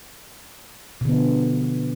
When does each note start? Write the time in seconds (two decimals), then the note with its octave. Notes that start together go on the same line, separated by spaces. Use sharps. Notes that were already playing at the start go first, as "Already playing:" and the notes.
1.01 B2
1.05 D3
1.09 B3
1.13 F3